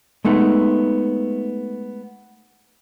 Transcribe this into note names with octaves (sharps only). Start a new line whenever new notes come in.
G#3 A3 B3 D#4